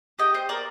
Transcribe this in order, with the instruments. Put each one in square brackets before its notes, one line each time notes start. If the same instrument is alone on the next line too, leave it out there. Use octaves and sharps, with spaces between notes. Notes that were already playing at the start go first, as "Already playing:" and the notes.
[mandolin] G4 D#5 G5
C5 D#5
A#3 A#4 D5